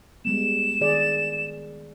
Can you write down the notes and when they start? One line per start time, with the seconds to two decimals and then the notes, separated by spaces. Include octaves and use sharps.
0.25 G3 G#3 B3 E7
0.81 D#3 G#4 D5